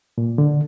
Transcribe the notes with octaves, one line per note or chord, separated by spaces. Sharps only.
A#2
D3